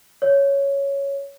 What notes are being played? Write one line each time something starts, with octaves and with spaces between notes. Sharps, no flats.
C#5